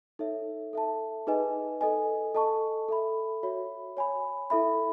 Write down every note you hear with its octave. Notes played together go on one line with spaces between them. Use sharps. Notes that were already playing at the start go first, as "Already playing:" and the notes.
D#4 A4 C#5 E5
A4 E5 A5
D#4 G#4 B4 D#5 G#5
A4 D#5 G#5
A4 D#5 A5 C#6
A4 E5 B5
F#4 C#5 E5 B5
C#5 G#5 B5
E4 A4 E5 B5